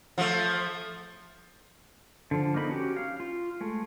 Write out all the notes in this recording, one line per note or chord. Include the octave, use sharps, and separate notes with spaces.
F3 A3
D3 F3
A#3 B3 D#4 B5
C#4 F#4 G4
F5
F4
G#3 A3